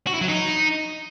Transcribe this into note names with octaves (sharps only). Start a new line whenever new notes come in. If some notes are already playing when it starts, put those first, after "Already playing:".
F#4
E4
F#3
D#4